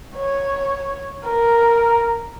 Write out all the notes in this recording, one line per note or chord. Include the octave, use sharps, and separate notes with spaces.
C#5
A#4